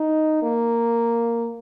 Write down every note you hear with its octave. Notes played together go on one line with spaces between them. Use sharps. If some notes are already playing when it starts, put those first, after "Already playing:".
Already playing: D#4
A#3